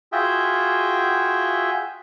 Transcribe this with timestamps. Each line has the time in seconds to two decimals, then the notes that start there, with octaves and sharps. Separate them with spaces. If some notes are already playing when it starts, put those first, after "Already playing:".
0.12 F4 F#4 G#4 E5 G5